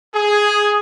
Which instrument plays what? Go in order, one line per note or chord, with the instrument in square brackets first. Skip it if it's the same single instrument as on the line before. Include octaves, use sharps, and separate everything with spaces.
[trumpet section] G#4